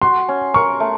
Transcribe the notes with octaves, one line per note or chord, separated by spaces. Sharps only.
F#4 C6
C#4
A#4 C#6
A3